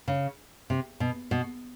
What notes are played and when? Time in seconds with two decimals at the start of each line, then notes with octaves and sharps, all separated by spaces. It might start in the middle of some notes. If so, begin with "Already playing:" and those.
0.08 C#3
0.70 C3
1.00 B2
1.31 B2